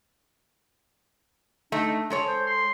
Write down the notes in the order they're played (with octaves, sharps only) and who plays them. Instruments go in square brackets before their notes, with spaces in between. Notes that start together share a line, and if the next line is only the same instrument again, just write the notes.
[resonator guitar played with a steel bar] A3 D#4 [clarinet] D4
[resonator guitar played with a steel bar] G#3 A4 C#5
[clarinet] C5
C6